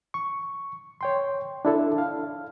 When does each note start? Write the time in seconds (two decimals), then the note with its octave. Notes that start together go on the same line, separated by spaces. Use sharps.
0.14 C#6
1.01 C#5 G5 C6
1.65 D4 E4 A4
1.98 F5